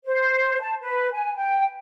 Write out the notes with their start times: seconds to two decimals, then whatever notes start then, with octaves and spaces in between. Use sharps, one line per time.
0.05 C5
0.61 A5
0.81 B4
1.12 G#5
1.36 G5